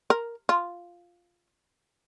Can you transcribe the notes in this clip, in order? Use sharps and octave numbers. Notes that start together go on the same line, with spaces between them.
A#4
F4